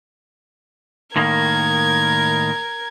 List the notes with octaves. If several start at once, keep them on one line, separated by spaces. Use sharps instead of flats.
A2 D#3 A#3 A#4 G#6